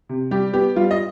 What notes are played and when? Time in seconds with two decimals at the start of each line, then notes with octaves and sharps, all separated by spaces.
0.09 C3
0.31 G3 G4
0.53 B3 G4
0.76 G3 F4
0.91 D#5